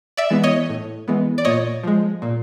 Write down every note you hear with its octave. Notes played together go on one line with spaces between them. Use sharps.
D5 E5
E3 G#3 B3
C#5 D#5
A2
E3 G#3 B3
D5
A#2 C#5 D#5
F3 G#3
A#2